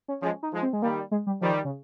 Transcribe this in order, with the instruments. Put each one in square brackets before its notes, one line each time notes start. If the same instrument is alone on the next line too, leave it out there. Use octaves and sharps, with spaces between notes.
[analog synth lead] C#4
[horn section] F3 G#3 [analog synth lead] C#4
[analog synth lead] D#4
[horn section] F3 G#3
[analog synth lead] C4
G#3
[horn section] D#3 G3 [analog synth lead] A#3
[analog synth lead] G#3
G3
[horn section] D#3 G3 [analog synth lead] F3
[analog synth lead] C#3